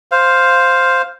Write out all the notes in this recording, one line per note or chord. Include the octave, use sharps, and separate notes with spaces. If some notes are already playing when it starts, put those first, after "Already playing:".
C5 F5